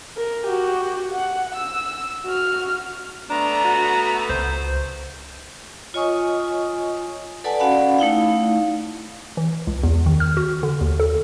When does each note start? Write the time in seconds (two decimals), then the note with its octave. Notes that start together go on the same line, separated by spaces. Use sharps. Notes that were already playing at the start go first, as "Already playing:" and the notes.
0.17 A#4
0.46 F#4 G4
1.12 F#5
1.55 E6
2.26 F#4 F6
3.30 A3 B3 D4 A#5
3.64 F#4
4.29 C#2 C5
5.94 F4 C#5 D#5 G#5 C#6 D#6
7.44 A4 B4 D5 F#5 G#5 A5
7.59 C#4 F#4 D5 F5 F#5 B5
7.98 A3 D#4 E4 F5
9.37 E3
9.67 C#2
9.83 E2
10.06 D#3
10.20 F6
10.37 F#4
10.63 D3
10.81 D#2
11.00 A4